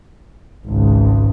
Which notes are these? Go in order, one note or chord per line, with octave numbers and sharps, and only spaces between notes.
G#1 C#2